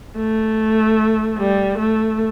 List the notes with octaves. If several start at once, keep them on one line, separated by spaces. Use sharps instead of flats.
A3
G3
A3